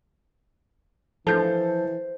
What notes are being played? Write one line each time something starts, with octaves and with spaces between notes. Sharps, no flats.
E3 F3 A4 C5 G6